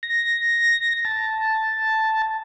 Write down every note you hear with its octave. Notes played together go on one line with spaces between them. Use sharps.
A#6
A5